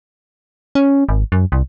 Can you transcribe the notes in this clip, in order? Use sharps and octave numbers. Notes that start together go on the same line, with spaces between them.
C#4
G#1
F#2
C2